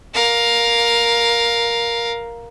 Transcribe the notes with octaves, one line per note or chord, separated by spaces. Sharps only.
A#4 F5